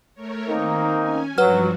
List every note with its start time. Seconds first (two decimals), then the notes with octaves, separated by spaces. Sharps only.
0.14 A3 A#4 C#5
0.49 D#3 A#3 C4 D#4
0.99 C#4 G#5
1.38 G2 F3 F#3 F#4 B4 F#5 F6